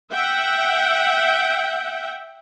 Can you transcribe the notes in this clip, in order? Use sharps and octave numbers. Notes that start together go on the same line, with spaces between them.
E5 F#5 G5